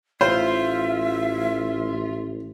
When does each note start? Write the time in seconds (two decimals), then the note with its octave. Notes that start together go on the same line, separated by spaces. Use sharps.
0.21 A1 F4 C5 E5